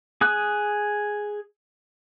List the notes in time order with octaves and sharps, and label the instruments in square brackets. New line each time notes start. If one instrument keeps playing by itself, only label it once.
[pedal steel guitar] G#4 D#6 F#6